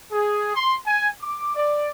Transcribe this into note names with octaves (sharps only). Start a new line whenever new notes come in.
G#4
C6
G#5
D6
D5